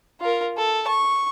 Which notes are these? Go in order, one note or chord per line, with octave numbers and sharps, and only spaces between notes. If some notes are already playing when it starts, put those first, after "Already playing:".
F4 A#4
A4
C#6